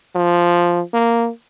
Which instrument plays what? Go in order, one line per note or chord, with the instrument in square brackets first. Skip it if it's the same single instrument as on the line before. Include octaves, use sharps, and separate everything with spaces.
[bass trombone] F3
A#3